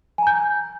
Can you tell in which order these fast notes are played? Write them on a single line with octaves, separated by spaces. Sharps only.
G#5 A#5 G6